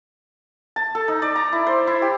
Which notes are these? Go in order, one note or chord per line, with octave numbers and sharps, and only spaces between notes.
A5
A4
D#4
D5
A#5
E4
C5
E4
G4